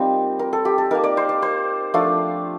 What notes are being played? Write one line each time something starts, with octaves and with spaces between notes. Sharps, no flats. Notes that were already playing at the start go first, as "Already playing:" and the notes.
Already playing: G3 A#3 C4 D#4 F4
A#4
A4
G4
A4
A#3 D#4 A#4
D5
C5
D5
C5
F3 A3 D4 F4